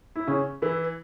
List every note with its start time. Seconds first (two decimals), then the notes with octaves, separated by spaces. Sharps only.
0.16 E4
0.27 C#3 C#4
0.62 E3 E4